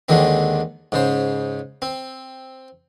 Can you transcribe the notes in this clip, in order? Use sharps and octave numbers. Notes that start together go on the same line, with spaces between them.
D#2 D3 D#3 G#3 C4
G#2 C#3 C5
C4